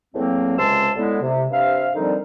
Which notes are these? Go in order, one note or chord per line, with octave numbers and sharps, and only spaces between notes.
E2 A2 F#3 A#3 C4
C#2 C3 G#3 A5 C6 E6
A2 D3 G#3 B3 E4
C3
G2 C3 E5 F5
D3 D#3 F3 G3 C4 D#4